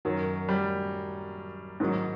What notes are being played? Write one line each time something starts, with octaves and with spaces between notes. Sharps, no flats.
F#2 D#3 F#3
G3
G#2 D#3 F#3